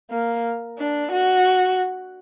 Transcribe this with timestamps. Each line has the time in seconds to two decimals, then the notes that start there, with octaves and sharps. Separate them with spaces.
0.10 A#3
0.78 D4
1.12 F#4